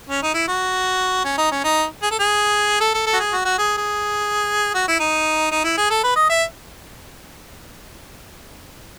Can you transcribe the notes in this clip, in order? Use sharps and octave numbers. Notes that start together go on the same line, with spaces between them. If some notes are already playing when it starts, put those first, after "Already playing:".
C#4
D#4
E4
F#4
C#4
D#4
C#4
D#4
G#4
A4
G#4
A4
A4
A4
F#4
G#4
F#4
F#4
G#4
G#4
F#4
E4
D#4
D#4
E4
G#4
A4
B4
D#5
E5